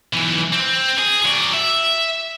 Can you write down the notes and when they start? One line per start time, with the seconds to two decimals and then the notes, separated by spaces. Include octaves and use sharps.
0.13 B1 E3
0.53 C4
0.99 G#4
1.25 F#3 D5
1.54 E5